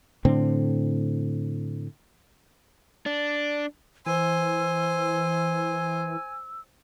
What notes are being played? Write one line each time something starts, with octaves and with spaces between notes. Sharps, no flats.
A2 D3 C4
D4
E3 C5 G#5 E6